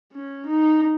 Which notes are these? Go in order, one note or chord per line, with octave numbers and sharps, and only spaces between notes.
C#4
D#4